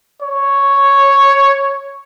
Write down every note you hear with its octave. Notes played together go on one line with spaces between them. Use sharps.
C#5